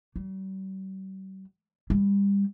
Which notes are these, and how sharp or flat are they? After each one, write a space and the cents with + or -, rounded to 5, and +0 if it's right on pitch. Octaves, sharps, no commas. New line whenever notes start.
G3 -45
G3 +30